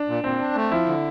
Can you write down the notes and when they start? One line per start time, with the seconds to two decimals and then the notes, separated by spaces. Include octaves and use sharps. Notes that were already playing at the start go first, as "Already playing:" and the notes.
Already playing: D4
0.08 A#2
0.24 A#2 C4
0.40 D4
0.55 A3
0.71 F3 E4
0.87 D3